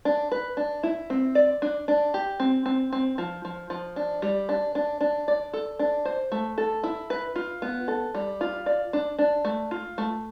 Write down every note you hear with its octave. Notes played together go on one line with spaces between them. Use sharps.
D4
B4
D4
E4
C4
D5
D4
D4
G4
C4
C4
C4
F3
F3
F3
D4
G3
D4
D4
D4
D5
A4
D4
C5
A3
A4
E4
B4
F4
B3
A4
G3
F4
D5
D4
D4
A3
F4
A3